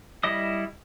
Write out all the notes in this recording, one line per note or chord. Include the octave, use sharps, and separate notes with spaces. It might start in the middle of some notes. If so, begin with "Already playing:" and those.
G3 E4 D#5 D#6